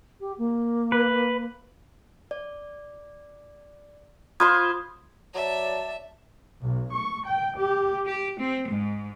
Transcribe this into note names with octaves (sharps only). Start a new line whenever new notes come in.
G4
A#3
B4
D5
F4 C5 B5 C6 D#6 G#6
F#3 D5 E5 A5
B1
C#6
G5
G4
G4
C4
G#2